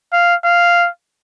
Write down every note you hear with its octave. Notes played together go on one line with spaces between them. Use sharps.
F5
F5